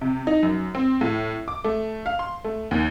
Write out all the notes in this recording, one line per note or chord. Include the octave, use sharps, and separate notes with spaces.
C3
D#4
F#2
C4
A2
D6
A3
F5
C6
A3
D#2